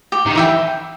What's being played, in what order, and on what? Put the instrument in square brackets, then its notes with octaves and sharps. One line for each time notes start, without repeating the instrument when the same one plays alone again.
[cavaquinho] G4
[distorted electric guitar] D#3
[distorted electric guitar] E3 [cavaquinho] B4 E5 G5